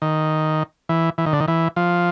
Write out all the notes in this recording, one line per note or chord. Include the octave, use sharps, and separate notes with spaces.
D#3
E3
E3
D#3
D3
D#3
E3
F3